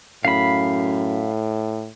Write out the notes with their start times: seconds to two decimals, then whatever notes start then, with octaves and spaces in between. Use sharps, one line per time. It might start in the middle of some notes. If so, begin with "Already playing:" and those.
0.25 F#2 A2 F5 B5